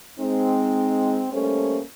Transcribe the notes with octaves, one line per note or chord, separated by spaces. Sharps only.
G#3 C4 D#4
G3 A3 A#3 C#4 A4 C5